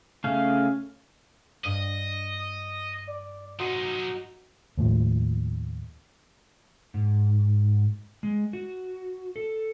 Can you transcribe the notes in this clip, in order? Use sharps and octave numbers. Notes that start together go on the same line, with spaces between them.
C#3 A3 C#4 G#4 F5
G2 D#5 D#7
D5
F#3 D#4 F#4 D#5 A#5 C6
D#2 A2 F3
G#2
G#3
F#4
A4